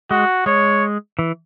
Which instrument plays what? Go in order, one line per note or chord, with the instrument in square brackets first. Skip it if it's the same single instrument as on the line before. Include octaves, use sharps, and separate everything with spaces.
[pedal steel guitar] G#3 [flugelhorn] F#4
[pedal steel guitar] G#3 [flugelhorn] C#5
[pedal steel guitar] E3